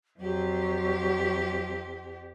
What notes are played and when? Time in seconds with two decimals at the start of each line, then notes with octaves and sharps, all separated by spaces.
0.19 F2 F#3 G4